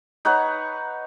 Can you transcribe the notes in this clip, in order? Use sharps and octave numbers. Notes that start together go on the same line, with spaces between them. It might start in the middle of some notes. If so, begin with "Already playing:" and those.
D#4 B4 C#5 F#5